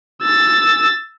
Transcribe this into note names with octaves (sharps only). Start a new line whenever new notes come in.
E6 A6